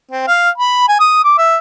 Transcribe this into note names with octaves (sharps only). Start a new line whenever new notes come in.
C4
F5
B5
G#5
D#6
D6
E5